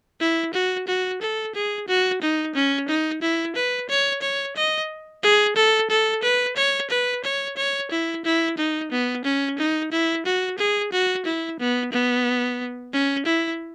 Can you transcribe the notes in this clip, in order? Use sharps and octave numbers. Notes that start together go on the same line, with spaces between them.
E4
F#4
F#4
A4
G#4
F#4
D#4
C#4
D#4
E4
B4
C#5
C#5
D#5
G#4
A4
A4
B4
C#5
B4
C#5
C#5
E4
E4
D#4
B3
C#4
D#4
E4
F#4
G#4
F#4
E4
B3
B3
C#4
E4